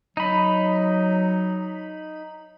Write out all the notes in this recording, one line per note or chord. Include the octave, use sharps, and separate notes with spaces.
F#3 D#4 B5